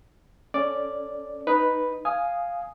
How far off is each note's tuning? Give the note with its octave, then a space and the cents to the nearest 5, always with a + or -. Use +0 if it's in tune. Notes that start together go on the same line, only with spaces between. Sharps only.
C#4 +0 A4 +0 D5 +0
D#4 +0 B4 +0
F5 +0 G#5 +0 D#6 +0